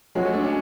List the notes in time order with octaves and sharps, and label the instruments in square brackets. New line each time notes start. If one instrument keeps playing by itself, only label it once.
[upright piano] F#3 C#4 F#4 C#5 [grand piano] G#3
[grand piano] A3
D4
C#4